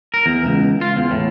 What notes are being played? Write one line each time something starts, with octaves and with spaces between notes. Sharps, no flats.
A#4
E2
C#2
F4
E2
A2